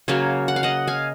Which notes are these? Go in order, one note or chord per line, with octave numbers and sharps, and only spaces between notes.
C#3 F#3 A#3 C#5 F5
F#5
F5
D#5 F#5
F5 G#5